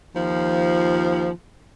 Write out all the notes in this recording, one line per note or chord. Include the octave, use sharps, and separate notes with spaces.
D#2 F3